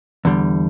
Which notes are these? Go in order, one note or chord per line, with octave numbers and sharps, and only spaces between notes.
E2 D3 G3